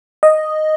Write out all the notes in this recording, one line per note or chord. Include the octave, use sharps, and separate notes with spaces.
D#5